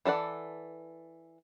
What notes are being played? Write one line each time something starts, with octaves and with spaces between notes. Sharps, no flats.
E3 A4 D5 F#5